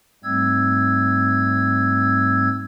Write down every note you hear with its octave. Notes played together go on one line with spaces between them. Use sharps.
G#2 G3 A3 C4 E6 G#6